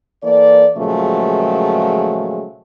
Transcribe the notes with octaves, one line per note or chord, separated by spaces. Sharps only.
E3 A#3 A4 D5
A#2 C#3 F3 F#3 G#3 A3